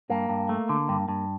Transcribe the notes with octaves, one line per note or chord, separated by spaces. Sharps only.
G2 A#3
G2
A3
D3
G2
G2